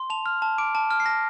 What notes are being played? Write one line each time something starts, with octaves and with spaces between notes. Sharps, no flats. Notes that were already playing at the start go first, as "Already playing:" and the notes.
Already playing: C6
A5 F7
F6
A5
D6 D7
A5
F6
C7
A5 A#6